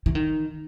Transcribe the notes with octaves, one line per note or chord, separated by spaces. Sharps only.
E3
D#3